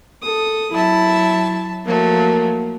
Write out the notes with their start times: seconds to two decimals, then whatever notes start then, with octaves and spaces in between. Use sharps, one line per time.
0.22 A4 D#6
0.72 F#3 E4 E5 A5
1.85 F3 F#3 A3 A#3